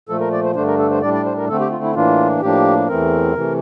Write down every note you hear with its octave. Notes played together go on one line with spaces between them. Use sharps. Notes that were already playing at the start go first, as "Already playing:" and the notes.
A#2 F3 A3 A4
A#4
D5
C5
G2 D3 A3 D4 C5
A#4
A4
C5
A2 G3 D4 D5
D5
C5
A#4
D3 A3 C4 A4
G4
F4
E4
A2 E3 A#3 D4 F4
A2 F3 A#3 D4 G4
E2 E3 A3 C4 A#4
C3 E3 A3